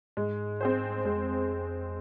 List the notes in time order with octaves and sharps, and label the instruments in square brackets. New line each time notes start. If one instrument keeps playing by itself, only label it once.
[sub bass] G#2 [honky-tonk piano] G#3
[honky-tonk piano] C4 G#4 C5
[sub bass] F2 [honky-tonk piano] G#3